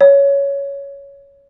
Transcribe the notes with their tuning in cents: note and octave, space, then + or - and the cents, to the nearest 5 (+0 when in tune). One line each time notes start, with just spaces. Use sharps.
C#5 +10